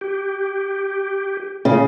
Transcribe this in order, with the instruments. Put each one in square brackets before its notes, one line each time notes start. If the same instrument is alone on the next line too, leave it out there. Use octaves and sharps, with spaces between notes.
[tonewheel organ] G4
[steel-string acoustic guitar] C#3